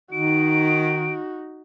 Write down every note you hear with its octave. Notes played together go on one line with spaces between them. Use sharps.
D#3 D#4 F#4 D7